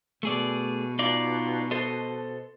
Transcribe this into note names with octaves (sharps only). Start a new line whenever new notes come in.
B2 A3 G#4 D5
D#4 F4 D5
A4 C5 D#5